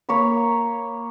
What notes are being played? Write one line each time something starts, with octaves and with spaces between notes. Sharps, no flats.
A#3 C#5 A#5 B5